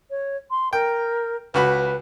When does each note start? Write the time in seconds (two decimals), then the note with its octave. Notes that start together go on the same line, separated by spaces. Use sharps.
0.10 C#5
0.51 C6
0.73 A#4 G5
1.54 C#2 F#4 B4 B5